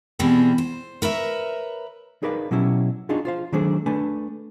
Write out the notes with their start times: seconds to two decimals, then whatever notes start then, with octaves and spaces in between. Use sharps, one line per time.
0.19 B2 E3 G3 C4 G#4
0.58 C5
1.02 A#4 B4 C#5 E5
2.22 D#4 G#4 A#4 B4 D5 F5
2.51 B2 F#3 C#4 E4 G4
3.09 D4 D#4 F4 F#4 G#4
3.25 F4 C5 F5
3.52 D#3 F#3 A3 D4 G#4 C5
3.86 A3 D4 B4 G#5